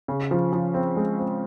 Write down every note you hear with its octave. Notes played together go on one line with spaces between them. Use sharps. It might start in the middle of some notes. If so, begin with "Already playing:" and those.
C#3
F3
F3
C4
G#3
C4